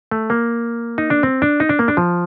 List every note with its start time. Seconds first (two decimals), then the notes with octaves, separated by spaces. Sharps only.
0.11 A3
0.30 A#3
0.98 D#4
1.10 D4
1.23 C4
1.42 D4
1.60 D#4
1.69 D4
1.79 A#3
1.88 D4
1.97 F3